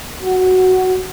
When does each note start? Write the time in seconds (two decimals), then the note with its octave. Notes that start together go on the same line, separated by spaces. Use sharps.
0.22 F#4